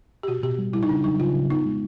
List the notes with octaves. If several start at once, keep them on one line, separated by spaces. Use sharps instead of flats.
G4
B2 F#4
B2 G4
G3
G3 E4
D#4
C#3 D4
F#3 D#4
C#3 F4
C#3
B3 D#4
G#3